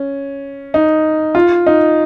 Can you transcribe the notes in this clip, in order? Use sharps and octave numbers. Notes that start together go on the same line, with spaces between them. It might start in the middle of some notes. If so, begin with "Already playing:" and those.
Already playing: C#4
D#4
F4
D#4